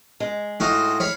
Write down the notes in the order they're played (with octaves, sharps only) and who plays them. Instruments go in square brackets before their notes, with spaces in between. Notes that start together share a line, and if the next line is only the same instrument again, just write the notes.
[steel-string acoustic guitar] G#3
[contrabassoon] A2 [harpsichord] D#4 F4 F#4
[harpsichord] C#5 F5 B5